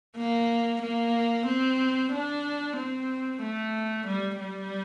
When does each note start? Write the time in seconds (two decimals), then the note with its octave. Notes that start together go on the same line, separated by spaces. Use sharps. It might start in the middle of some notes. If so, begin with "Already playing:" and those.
0.17 A#3
0.82 A#3
1.47 C4
2.13 D4
2.77 C4
3.42 A3
4.07 G3
4.39 G3